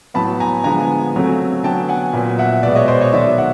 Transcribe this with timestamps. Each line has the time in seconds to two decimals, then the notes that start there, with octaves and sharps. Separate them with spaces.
0.14 A2 F#3 B3 A5 B5
0.40 G#5 A#5
0.64 D3 F3 G#3 B3 G#5 A#5
1.15 C#3 F#3 A3 C4
1.63 D3 F#3 B3 G5 A5
1.89 F#5 G#5
2.13 A#2 F#3 B3
2.38 E5 F#5
2.63 B2 G#3 B3 D5 E5
2.75 C#5 D#5
2.88 C5 D5
3.01 C#5 D#5
3.13 D#3 F#3 B3 D5 E5
3.38 E5 F#5